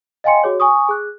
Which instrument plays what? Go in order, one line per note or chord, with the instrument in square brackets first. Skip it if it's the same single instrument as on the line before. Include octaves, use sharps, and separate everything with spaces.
[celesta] D#5 F5 G5 G#5 C6 C#7
F#4 G#4 C#5
G#5 C#6 D#6
G#4 F#6